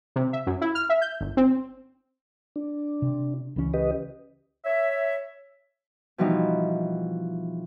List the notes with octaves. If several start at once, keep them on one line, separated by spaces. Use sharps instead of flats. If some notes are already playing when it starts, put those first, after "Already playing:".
C3
E5
F#2
E4
F6
E5
G6
G1
C4
D4
C3
C#2 E3 C#4
G4 B4 D#5
C#5 E5
B2 E3 F3 G3 D#4